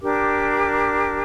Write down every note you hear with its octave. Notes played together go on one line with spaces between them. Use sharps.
D4 G4 A#4 D6